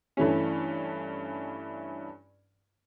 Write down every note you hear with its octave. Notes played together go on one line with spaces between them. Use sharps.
G2 E3 A3 C#4